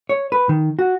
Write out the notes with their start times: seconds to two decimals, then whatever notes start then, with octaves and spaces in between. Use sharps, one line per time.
0.09 C#5
0.32 B4
0.49 D#3
0.79 F#4